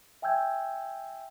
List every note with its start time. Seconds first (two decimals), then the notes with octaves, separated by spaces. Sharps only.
0.22 E5 G5 G#5 E6 G6 G#6